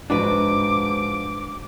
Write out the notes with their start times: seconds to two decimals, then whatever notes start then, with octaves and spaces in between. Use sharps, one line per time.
0.10 G#2 F3 D4 F#4 B4 D6